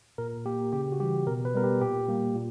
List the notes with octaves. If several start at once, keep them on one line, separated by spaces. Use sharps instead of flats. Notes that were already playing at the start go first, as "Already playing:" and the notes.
A#2 A#4
A#3 G4
C#3 G4
F#4
E3 G3 G4
B2 A#4
B4
G3 B3 A#4
G4
A#2 G4
G3 A#3
A#2